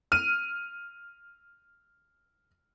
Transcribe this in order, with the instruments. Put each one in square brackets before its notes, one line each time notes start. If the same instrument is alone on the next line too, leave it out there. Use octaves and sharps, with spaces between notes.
[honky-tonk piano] F6 D#7